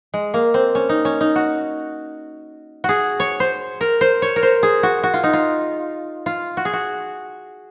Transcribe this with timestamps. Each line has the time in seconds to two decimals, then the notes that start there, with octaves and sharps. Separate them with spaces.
0.14 G#3
0.34 A#3
0.54 C4
0.75 C#4
0.89 D#4
1.05 C#4
1.21 D#4
1.36 F#4
2.84 F#4 G#4
3.20 C#5
3.40 C5
3.81 A#4
4.01 C5
4.22 C#5
4.36 A#4
4.43 C5
4.63 G#4
4.83 F#4
5.03 F#4
5.14 F4
5.24 D#4
5.33 F4
6.26 F4
6.57 F#4
6.65 G#4
6.73 F#4